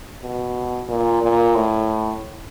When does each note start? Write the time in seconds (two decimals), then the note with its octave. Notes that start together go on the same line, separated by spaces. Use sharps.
0.22 B2
0.88 A#2
1.22 A#2
1.55 A2